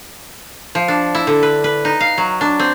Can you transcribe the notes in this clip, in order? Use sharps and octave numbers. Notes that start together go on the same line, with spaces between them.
F3
D4
E4
D3
B4
B4
D#4
F5
F#3
D4
C4